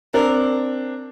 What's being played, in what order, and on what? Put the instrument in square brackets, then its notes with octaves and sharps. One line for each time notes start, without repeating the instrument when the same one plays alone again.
[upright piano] C4 D4 [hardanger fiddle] A#4